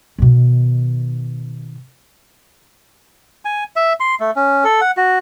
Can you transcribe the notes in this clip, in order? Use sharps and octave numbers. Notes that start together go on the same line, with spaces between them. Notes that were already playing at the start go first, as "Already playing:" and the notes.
B2 D#3
G#5
E5
C6
A3
C#4
A4
F#5
F#4